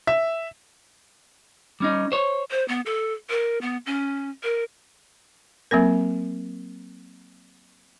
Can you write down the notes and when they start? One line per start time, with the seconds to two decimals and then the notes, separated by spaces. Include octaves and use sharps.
0.07 E5
1.80 G3 C#4 D#4
2.12 C5 C#5
2.51 C5
2.68 B3
2.86 A4
3.30 A#4
3.61 B3
3.86 C#4
4.43 A#4
5.71 F#3 A#3 C4 A#4